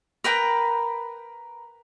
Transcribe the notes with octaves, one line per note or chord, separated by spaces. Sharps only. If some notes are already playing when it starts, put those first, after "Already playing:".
A#4 B4 G5 A#5